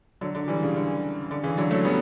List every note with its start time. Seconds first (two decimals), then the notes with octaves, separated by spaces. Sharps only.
0.21 D3 F#3
0.35 D3
0.48 E3 G3
0.62 C#3
0.76 D3
1.31 D3
1.43 C#3 E3
1.57 D3 F#3
1.71 F#3 A3
1.84 G3 B3